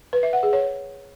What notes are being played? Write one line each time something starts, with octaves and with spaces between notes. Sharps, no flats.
B4
E5
F#5
G#4
C#5